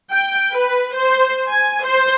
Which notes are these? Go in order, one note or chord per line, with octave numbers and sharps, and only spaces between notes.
G5
B4
C5
G#5
C5